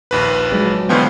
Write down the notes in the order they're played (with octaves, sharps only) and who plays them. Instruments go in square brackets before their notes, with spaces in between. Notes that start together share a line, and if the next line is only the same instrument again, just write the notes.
[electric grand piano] A#1 D#2 B4
[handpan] F#3 G#3 D4
[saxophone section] B2 F3 [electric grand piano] D3 E3 G5 [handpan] B3